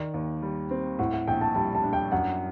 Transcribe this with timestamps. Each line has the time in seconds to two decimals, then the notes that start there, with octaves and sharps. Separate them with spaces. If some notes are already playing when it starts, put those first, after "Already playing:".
Already playing: D#3 D5
0.14 D#2
0.42 G3
0.71 C4
0.99 A2 F#5
1.13 F#5
1.28 A#1 G5
1.41 A5
1.55 G3 A5
1.75 A5
1.83 D4
1.93 G5
2.12 F#2 F#5